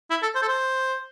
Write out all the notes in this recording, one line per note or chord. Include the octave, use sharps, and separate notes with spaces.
E4
A4
C5
A4
C5